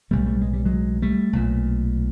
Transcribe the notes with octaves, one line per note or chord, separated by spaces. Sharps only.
B1 A2 G3 A3
G3 A3
G#3
G3
F#3 G#3
G3 A3
B1 A#2